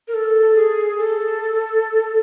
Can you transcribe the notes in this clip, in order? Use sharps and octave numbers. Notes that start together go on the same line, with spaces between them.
A#4
A4
G#4
A4